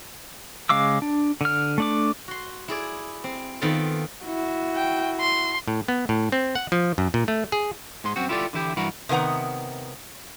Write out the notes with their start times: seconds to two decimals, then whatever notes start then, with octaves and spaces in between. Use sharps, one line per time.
0.69 C#3 G#3 F5 D6 E6
1.02 D4
1.41 D3 F6
1.78 A3 D4 D6
2.28 F#4 C6
2.68 E4 G#4 D5
3.24 C4
3.62 D#3 B3 C4 F4 A4
4.24 E4 F#4
4.75 G5
5.20 C6
5.68 A2
5.88 B3
6.09 A2
6.32 C4
6.55 F#5
6.72 F3
6.98 F#2
7.14 A#2
7.28 A3
7.52 G#4
8.04 G#2 G#3 C6
8.16 F#2 C4 F#4
8.29 E4 F4 G4 A4 C5 D5
8.53 D3 E3 E4 G4
8.77 G2 E3 F#4 A#4 B5
9.09 C3 D#3 B3 F#5 A#5